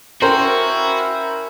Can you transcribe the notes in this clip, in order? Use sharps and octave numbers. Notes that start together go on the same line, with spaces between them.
C#4 E4 F#4 A#4 C5 G5